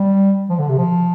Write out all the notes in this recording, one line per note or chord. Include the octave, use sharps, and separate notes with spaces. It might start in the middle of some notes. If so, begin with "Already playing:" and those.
Already playing: G3
F3
D3
C3
F3